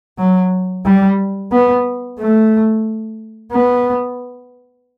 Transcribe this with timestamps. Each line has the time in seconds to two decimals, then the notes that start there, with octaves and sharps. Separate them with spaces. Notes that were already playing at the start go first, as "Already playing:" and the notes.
0.19 F#3
0.85 G3
1.52 B3
2.19 A3
3.52 B3